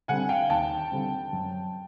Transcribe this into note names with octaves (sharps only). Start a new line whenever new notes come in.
D3 G3 C4 F#5 G#5
F5 G5
D#2 G5 A5
D3 G3 C4
F#2